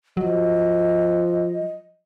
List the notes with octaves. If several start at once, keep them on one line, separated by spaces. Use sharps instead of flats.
F3 F#3 D#5